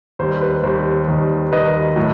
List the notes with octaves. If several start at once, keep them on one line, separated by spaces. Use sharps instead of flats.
D#2 D#3 G3 C5
B4
D#2 D#3 G3 C5
D#2 D#3 G3
D#2 D#3 G3 B4 D#5
A2 F#3